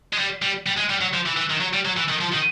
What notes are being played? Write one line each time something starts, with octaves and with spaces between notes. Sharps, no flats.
G#3
G3
G3
G3
G#3
G3
F#3
F3
E3
E3
D#3
F#3
G3
F#3
E3
D#3
F3
D#3